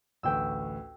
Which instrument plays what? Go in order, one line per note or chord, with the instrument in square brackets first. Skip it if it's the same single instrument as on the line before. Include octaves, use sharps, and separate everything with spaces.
[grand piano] A1 D2 B4 [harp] G5 E6